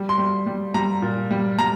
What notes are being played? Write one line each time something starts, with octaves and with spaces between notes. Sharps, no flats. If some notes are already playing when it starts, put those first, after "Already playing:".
Already playing: G3
C6
G3
G3
G3 A#5
A#2
G3
G3 A#5